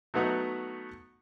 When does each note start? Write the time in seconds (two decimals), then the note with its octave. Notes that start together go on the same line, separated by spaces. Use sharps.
0.14 F#3 A3 B3 D#4 F#4